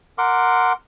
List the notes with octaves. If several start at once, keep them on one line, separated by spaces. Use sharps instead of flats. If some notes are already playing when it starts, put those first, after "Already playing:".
A#4 F#5 C6 D6